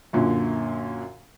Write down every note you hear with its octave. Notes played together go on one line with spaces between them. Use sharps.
F#2 A#2 D3